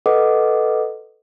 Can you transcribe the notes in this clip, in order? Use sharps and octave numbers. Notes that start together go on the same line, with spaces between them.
A4 B4 D#5 F#5 D6 D#6